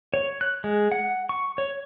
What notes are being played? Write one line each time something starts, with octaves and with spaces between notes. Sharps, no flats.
C#5
F#6
G#3
F#5
C#6
C#5